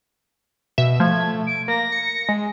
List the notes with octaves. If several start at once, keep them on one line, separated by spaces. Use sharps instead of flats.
B2 E5
F3 A3 G#6
D7
A#3 A#6
C#7
G#3